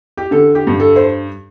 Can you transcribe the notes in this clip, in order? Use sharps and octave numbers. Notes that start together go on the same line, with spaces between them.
G4
D3 A4
G4
G2
A4
C5